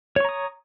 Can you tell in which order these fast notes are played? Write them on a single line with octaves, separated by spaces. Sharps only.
C#5 C#6 A#5 D#6